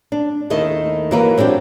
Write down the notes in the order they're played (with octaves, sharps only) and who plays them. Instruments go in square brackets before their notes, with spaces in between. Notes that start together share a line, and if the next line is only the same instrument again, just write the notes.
[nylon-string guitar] D4
D#2 D#3 A3 E4 D#5
E3 F#3 A#3 A#4 B4
F#3 C4 D4 F#4 G4